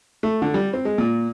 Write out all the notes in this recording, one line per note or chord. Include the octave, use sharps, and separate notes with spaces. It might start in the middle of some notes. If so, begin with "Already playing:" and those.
A3
D3
G3
C4
G#3
A#2